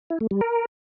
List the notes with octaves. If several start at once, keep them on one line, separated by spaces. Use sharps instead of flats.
E4
A3
G3
A#4